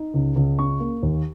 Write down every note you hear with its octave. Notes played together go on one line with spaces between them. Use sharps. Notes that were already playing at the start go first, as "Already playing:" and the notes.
Already playing: D#4
C#2
C#2
C#4 C#6
A#3
D#2